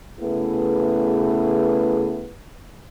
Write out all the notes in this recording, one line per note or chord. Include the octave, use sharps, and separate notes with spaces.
C#3 A3 B3 E4 G#4 B4